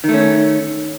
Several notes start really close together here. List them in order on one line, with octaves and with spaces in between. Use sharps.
D#3 A3 C#4